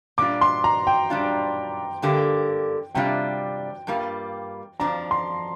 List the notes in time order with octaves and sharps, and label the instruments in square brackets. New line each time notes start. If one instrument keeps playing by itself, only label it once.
[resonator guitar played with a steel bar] A#2 G3 D4 F4 [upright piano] D6
[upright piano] C6
A#5
G5
[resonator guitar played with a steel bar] A#2 G3 D4 F4
G2 D3 A#3 G4
[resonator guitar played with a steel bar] C3 G3 D4 F4 [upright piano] G5
[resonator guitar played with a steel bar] G2 G3 A#3 F4
[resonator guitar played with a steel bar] F2 F3 D4 [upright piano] A#5
[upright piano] C6